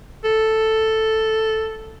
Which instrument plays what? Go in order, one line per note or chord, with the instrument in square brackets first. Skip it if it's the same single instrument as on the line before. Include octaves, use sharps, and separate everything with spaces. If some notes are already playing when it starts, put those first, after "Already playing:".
[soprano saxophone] A4